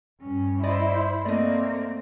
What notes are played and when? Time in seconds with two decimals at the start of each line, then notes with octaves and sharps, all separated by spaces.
0.22 G2 C#4
0.63 E4 C5 D5 D#5
1.25 A3 A#3 C4 D5 D#5